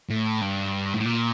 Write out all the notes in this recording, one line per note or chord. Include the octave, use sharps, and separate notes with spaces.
A2
G2
A2
A#2